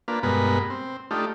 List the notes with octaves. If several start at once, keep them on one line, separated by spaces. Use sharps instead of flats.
A#3 D4 F4 B4
G2 B2 G#3 B3 A#4 B4
C4
A3 D4 D#4 F4 G4